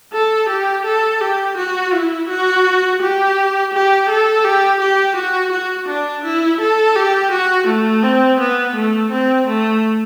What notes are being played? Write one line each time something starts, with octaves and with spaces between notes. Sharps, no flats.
A4
G4
A4
G4
F#4
E4
F#4
G4
G4
A4
G4
G4
F#4
F#4
D4
E4
A4
G4
F#4
A3
C4
B3
A3
C4
A3